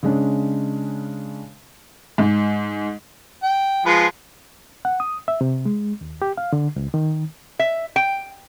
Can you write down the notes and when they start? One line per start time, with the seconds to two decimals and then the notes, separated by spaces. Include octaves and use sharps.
0.03 C#3 G#3 C#4 D4
2.18 G#2
3.43 G5
3.86 F3 G#3 B4
4.85 F#5
5.00 D#6
5.28 E5
5.41 C3
5.66 G#3
6.01 D#2
6.22 G4
6.37 F5
6.53 D3
6.76 C#2
6.94 D#3
7.59 E5
7.96 G5